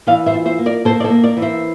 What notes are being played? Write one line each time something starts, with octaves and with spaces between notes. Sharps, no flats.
E3 D5 F5
C5 E5
F4
C5 E5
A#3
A#4 D5
A#3 A4 C5
D5
A4 C5
A#3
A#4 D5
E3
C5 E5